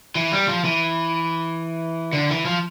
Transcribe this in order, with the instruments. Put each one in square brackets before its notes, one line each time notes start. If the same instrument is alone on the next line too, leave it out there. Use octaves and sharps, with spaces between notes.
[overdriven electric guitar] E3
G3
F3
E3
D3
E3
F3